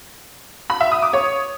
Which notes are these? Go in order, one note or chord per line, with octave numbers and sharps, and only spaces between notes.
B5
E5
D#6
D6
C#5